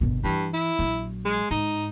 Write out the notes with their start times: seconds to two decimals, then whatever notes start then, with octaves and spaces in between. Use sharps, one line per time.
0.01 G1 B2
0.24 G2 E3
0.54 E4
0.79 A#1 F#3
1.26 G#3
1.51 G#2 D#4